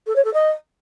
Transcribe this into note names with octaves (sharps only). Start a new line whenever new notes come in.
A4
C#5
A4
D#5